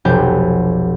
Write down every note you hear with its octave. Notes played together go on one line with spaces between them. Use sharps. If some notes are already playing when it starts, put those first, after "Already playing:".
F1 B1 G4 G6